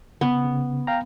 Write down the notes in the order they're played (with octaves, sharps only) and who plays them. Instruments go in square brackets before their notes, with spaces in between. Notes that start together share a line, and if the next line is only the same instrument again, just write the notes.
[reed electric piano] C#3 [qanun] B3
[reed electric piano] C#3
F5 G5 A#5